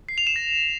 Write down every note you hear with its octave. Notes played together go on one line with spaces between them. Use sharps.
C7
F7
E7
A#6